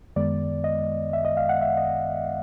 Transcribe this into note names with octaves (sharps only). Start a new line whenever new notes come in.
F#2 D#3 G#3 B3 D5
D#5
E5
D#5
F5
F#5
E5
D#5